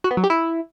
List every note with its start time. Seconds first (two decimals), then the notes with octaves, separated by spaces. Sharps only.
0.04 F#4
0.11 B3
0.17 F#3
0.24 G4
0.30 E4